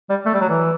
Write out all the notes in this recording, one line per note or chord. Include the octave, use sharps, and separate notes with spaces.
G3
A3
G3
F#3
E3